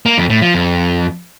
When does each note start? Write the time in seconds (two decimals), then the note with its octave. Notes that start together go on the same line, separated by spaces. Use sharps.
0.06 A#3
0.18 F2
0.30 A2
0.42 F3
0.54 F2